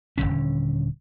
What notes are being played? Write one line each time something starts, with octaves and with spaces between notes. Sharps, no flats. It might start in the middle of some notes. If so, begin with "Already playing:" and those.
D#1 C#2 D3 C#4